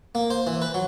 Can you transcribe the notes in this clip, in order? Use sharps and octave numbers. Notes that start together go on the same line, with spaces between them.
A#3
C5
E3
B4
F#3